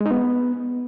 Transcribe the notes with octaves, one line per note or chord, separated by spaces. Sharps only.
G#3
D#4
B3